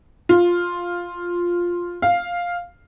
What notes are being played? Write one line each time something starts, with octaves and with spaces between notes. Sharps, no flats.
F4
F5